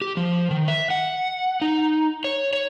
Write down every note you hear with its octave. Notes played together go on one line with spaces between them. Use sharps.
G4
F3
D#3
E5
F#5
D#4
C#5
C#5